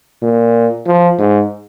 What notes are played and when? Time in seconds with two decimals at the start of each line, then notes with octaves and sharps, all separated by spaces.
0.23 A#2
0.86 F3
1.19 G#2